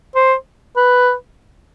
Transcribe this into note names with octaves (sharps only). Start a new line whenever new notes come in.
C5
B4